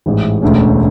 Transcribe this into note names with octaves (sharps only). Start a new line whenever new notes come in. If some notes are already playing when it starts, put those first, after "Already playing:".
A1 G#2 E3
E1 D2 D3 A3 C#4